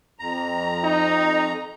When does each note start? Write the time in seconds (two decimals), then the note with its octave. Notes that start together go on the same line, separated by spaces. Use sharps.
0.19 F2 A#5
0.84 D#4